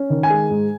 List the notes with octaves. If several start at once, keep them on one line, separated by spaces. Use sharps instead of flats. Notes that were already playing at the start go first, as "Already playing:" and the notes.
Already playing: C#4
D#3
G#5
G#3
G#2